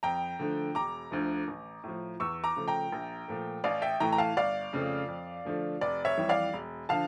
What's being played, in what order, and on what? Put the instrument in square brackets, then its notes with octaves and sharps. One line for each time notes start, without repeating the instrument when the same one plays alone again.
[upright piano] F2 G5 A#5
D3 F3 A3
E1 A#5 D6
D2 D3 F3 A3
A1
A2 F3
E2 C#6 E6
A#5 D6
C#3 F3 A3
G5 A#5
A#1
A#2 F3 A3
A1 D5 F5
E5 G5
A2 E3 A3 G5 A#5
A#5
F5 A5
G1 D5 F5
F2 C#3 F3 A3
F2
D3 F3 A3
F1 D5
C#5 E5
F2 E3 G3
D5 F5
E1
D3 F3 F5 A5